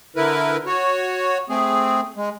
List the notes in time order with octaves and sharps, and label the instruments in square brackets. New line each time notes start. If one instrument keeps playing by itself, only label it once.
[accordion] D3 E4 A#4 B4
F#4 C#5
A3 C4 G#4
G#3